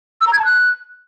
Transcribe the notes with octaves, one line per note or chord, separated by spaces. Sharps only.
E6
A#5
G#6
A5
F#6